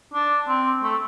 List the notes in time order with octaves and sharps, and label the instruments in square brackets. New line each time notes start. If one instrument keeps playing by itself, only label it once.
[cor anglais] D4
C4
A3